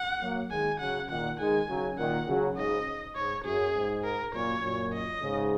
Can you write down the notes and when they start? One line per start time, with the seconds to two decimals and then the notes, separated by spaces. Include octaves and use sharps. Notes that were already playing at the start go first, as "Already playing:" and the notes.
Already playing: F#5
0.21 F#3 A#3
0.51 D#3 G#3 G#5
0.80 C#3 F#3 F#5
1.10 A#2 D#3 F#5
1.39 D#3 G#3 G#5
1.69 C#3 F#3
1.98 A#2 D#3 F#5
2.27 C#3 F#3
2.57 G#2 C#3 D#5
3.16 G#2 C#5
3.45 F#2 G#4
3.74 G#2
4.04 A#4
4.33 F#2 A#2 C#5
4.63 F#2 A#2
4.93 D#5
5.22 G#2 C#3